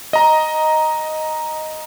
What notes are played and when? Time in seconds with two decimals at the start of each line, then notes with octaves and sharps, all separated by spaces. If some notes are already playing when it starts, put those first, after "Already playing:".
0.13 D#5 A#5